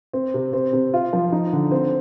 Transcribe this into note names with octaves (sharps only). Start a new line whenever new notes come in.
C4
C3
C4
C3
F4
F3
D#4
D3
C4